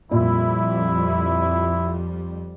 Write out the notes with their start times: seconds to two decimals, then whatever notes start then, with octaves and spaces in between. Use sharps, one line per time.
0.11 F2 A#2 G3 E4